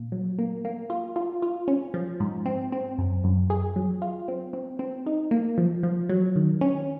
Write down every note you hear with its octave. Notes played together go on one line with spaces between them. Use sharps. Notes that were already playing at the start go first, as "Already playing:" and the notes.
Already playing: A#2
F#3
A#3
A#3
F4
F4
F4
C#4
F3
G#2
C4
C4
F#2
F#2
G#4
F#3
F4
C4
C4
C4
D#4
A#3
F3
F3
F#3
D#3
C#4